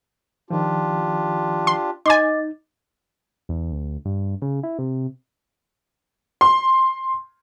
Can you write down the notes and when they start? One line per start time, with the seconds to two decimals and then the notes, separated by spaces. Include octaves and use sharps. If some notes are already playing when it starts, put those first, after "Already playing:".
0.50 D#3 F3 D4 F4 G4
1.67 C6
2.06 D#4 D#5 G#5 C6 D6 A6
3.49 E2
3.71 D2
4.05 G2
4.42 C#3
4.63 E4
4.79 C3
6.41 C6